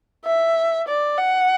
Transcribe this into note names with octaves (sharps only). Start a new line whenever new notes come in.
E5
D5
F#5